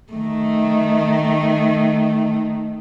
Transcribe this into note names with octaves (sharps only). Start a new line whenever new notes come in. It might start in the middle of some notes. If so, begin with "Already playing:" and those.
D#3 A3